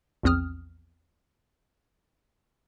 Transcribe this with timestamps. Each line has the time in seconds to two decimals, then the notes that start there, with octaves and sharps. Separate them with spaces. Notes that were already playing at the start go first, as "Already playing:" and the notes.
0.23 A#1 E2 C4 D#6 F6